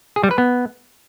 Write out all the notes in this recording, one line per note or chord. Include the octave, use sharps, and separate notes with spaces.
G#4
G3
B4
B3